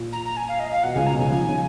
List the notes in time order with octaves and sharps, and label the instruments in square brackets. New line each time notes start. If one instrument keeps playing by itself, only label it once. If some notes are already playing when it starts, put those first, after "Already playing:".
Already playing: [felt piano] A#2
[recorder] A#5
A#5
G#5
F5
D#5
F5
[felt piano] B2 [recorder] F#5
[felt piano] C#2 C#3 [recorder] G#5
[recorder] A#5
[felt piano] B2
[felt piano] C#2 C#3 [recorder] G#5
[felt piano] F3
D#3
C#3